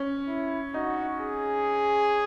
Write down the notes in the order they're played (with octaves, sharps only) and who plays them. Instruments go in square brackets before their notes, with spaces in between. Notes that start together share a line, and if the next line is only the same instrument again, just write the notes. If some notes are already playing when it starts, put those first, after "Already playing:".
Already playing: [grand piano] C#4
[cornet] E4
[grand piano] D#4 [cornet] F#4
[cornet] G#4